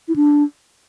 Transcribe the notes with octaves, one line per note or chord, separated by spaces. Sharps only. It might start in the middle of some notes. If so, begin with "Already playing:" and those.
E4
D4